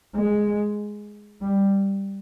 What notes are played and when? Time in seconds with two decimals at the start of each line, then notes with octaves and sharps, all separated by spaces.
0.16 G#3
1.42 G3